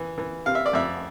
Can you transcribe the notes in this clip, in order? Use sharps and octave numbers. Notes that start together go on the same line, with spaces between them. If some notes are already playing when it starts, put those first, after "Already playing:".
Already playing: E3
E3
C3 F5
E5
D5
F2 E5